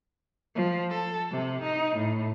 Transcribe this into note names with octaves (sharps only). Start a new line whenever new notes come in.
F3
A4
C3
D#4
A2